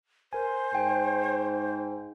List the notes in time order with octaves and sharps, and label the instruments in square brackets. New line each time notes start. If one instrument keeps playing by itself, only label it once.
[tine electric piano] A#4 G#5 [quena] C5
[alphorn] G#2 [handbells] G5 [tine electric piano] G#5